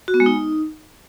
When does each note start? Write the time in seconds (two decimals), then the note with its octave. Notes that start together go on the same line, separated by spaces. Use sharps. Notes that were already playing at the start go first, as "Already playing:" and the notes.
0.08 F#4
0.14 B3
0.20 G#3
0.26 D#4